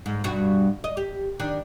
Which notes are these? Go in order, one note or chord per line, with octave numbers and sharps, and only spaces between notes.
G#2
G2 B2 F#4
D#5
G4
D#3 D4